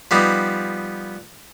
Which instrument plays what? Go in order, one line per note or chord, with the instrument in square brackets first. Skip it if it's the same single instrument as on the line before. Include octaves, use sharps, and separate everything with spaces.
[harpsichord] F3 G3 B3 D#4